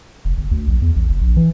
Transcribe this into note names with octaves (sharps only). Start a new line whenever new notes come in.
F1
G1
D2
A#1
E2
A1
F#1
A#1
E3